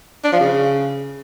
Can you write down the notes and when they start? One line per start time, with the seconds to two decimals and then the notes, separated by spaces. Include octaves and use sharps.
0.24 D4
0.32 F3
0.40 C#3